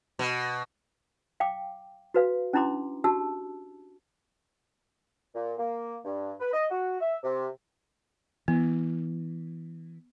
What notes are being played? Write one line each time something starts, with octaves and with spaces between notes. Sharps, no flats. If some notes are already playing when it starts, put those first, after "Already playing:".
B2
F5 G5 D6
F#4 B4 F5
C#4 D4 E4 A#5 C6 D6
D4 F#4 G4 A5 E6
A#2
A#3
G2
B4
D#5
F#4
E5
C3
E3 B3